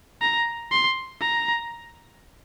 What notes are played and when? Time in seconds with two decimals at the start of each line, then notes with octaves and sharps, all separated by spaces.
0.21 A#5
0.72 C6
1.21 A#5